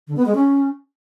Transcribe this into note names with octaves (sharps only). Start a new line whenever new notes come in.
D3
B3
G#3
C#4